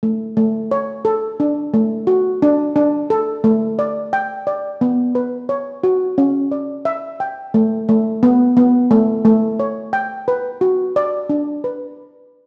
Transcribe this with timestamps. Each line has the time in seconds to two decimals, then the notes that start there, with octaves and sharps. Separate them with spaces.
0.03 A3
0.37 A3
0.71 C#5
1.05 A4
1.40 D4
1.74 A3
2.07 F#4
2.42 D4
2.76 D4
3.10 A4
3.44 A3
3.79 D5
4.13 G5
4.47 D5
4.81 B3
5.15 B4
5.49 C#5
5.84 F#4
6.18 C#4
6.51 D5
6.85 E5
7.20 G5
7.54 A3
7.89 A3
8.23 B3
8.57 B3
8.91 A3
9.25 A3
9.60 C#5
9.93 G5
10.28 B4
10.61 F#4
10.96 D5
11.29 D4
11.64 B4